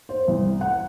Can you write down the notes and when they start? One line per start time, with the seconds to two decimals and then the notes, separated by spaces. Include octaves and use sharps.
0.09 C5
0.28 C2
0.61 F#5